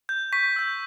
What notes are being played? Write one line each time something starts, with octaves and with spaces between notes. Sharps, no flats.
G6
C#6 B6
E6 G6